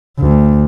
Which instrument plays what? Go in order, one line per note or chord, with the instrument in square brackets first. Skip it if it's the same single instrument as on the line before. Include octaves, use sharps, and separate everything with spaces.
[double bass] D2